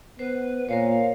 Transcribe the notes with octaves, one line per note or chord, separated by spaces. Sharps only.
B3 B4 C5
A#2 A#4 C5 C#5 F5